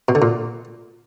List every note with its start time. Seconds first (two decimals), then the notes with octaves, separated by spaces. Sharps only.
0.09 B2
0.15 D3
0.22 A#2